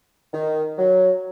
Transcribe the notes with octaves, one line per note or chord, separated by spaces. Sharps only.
D#3
F#3